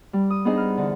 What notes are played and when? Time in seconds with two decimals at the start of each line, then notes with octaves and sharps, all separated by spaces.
0.13 G3
0.30 D#6
0.45 B3 D4 D#4 G#4 C5 D#5
0.58 F6
0.77 D3 E3